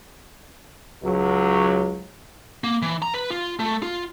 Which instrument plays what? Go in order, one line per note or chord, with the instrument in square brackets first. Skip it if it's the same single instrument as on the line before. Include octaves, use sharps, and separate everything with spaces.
[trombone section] C#2 F#3
[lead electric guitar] A#3
E3
A#5
B4
F4
A3
F4